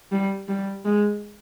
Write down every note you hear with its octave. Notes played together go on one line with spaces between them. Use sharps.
G3
G3
G#3